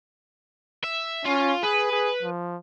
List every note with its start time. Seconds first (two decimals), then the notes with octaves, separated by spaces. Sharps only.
0.84 E5
1.25 C#4 F4
1.63 G#4 B4
1.92 G#4
2.23 F3